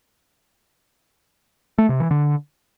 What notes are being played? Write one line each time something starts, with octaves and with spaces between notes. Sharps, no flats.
A3
C3
E3
D3